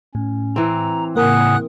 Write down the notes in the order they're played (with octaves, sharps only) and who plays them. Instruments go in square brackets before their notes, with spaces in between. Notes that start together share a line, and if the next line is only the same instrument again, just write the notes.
[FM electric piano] A2 [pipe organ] C#4
[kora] E3 C4 [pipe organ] A#5
[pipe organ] A2 C#3 D#6 [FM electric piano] A#3 A#4 [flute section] F#5 G#5 F#6